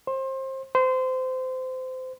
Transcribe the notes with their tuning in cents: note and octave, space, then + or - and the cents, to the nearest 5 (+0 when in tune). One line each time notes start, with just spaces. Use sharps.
C5 +25
C5 -25